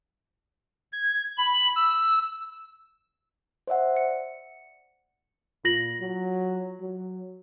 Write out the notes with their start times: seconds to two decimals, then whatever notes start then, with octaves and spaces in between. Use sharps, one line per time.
0.92 G#6
1.38 B5
1.75 E6
3.67 C5 D5 E5 F#5
3.96 C#7
5.65 A#2 F4 A#6 F#7
6.00 F#3
6.80 F#3